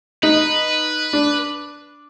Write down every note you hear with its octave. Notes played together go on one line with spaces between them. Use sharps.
D#4 B4
D4